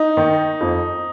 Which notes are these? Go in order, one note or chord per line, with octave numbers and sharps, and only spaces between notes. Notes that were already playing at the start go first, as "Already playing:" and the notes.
Already playing: D#4
D#3
F2